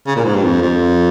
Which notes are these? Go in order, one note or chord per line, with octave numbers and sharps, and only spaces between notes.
C#3
A#2
G#2
G2
F2
F2